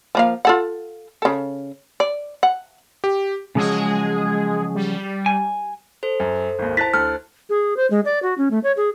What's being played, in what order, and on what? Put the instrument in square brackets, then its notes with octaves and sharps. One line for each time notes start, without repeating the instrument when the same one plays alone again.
[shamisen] F3 A#3 F5
F4 A4 F#5
C#3 A4
D5
F#5
[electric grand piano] G4
[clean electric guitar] C#3 F3 F#3 [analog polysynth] G#3 G#4
[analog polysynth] G3
[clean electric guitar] G#5
[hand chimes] A4 C5
[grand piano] F#2
G#1 D#2
[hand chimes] E4 C5 [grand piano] A5 F#6 A6 [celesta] B6
[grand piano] D2 A4 [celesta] F6 [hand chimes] F#6
[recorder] G#4
C5
G#3
D5
F#4
C#4
A3
C#5
G#4